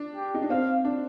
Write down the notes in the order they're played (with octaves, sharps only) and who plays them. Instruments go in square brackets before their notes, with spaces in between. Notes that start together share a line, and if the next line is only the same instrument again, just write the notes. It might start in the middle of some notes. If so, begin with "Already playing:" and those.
Already playing: [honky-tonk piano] D4
[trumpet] G4
[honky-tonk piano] D#4
D4
[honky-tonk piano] C4 [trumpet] F5
[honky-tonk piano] D4